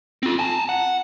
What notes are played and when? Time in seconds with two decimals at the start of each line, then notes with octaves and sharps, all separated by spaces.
0.23 C4 F4
0.39 G#5 A5
0.69 F#5